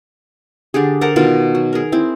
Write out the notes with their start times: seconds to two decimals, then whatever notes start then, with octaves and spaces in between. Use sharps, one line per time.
0.74 D3 D4 G4 G#4
1.01 A4 A#4 C5 F#5
1.16 B2 D#3 F4 A#4
1.55 F#3
1.73 G#4 A#4
1.92 C4 E4